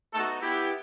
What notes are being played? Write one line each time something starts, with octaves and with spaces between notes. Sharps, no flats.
A3 B3 D#4 F#4 A4
B3 E4 G4